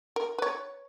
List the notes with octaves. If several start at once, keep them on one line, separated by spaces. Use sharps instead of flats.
A#4
B4 C#5